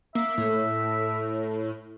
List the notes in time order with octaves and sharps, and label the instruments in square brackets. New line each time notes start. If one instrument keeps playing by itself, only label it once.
[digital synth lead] A#3 [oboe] E5
[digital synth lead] A2